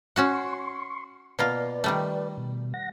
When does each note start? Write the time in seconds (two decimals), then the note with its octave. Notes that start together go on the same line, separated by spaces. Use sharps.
0.16 C#4 F#4 F#5 C6 C#6
1.39 B2 A#3 F4 B4 D5
1.84 D#3 G3 A3
2.38 B2
2.74 F#5 A#6